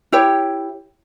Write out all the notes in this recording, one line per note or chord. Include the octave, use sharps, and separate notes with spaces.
E4 G4 C#5